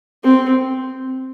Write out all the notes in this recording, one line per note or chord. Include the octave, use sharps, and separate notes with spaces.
C4